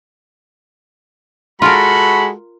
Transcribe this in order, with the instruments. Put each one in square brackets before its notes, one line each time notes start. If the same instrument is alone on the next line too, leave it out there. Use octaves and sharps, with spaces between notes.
[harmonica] G#3 F#4 A4 [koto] F4 A#4 [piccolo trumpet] B5